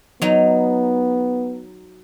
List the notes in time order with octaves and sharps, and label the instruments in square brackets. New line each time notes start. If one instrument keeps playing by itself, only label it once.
[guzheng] F#3 D#4 [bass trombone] B3